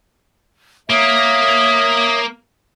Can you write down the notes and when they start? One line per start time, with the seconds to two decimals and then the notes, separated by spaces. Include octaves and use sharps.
0.90 A#3 C#5 E5 D#6